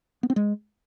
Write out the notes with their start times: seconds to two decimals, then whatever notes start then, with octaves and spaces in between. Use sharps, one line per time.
0.23 B3
0.30 C4
0.36 G#3